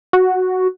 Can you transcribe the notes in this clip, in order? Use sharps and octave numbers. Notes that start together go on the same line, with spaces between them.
F#4